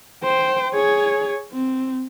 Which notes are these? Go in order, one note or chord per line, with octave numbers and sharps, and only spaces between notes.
C5 G5
G#4 C#5
C4